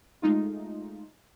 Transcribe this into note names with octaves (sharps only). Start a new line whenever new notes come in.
G#3 A3 D#4 F4